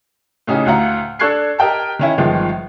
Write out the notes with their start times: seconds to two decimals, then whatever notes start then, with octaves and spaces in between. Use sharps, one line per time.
0.47 A2 C#3 C#4 D#4 G4
0.66 D2 A2 F5 F#5 A#5
1.19 D4 A4 C#6 F#6 G#6 C7
1.59 G4 A#4 D#5 G5 A5
1.99 D#3 C#4 E4
2.18 G1 D#3 F3 G#3